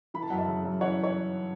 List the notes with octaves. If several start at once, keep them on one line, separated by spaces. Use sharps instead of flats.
E3 B5
A5
F#2 F#5
E5 A5
C#3
F#2
E3 C#5 F#5
C#5